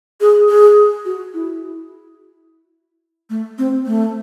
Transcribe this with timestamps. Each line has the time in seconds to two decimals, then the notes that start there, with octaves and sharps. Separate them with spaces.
0.21 G#4
0.49 G#4
1.05 F#4
1.34 E4
3.30 A3
3.58 C4
3.86 A3